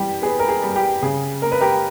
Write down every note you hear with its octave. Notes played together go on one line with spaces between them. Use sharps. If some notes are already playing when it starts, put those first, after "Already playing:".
Already playing: E3 G3 G4
B3 G#4
A#4
G#4
G3
G4
C#3 G#4
A#3 A#4
B4
G4 A#4